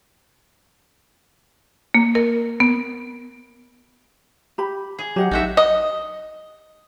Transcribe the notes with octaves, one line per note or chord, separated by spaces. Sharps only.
A#3
A#4
B3
G4 B5
G#4
F#3 G4 D#5 F#5
A1 D#4 F#4 E5
D#5